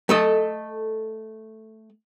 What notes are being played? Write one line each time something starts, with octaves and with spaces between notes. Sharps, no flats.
A3 A4 D#5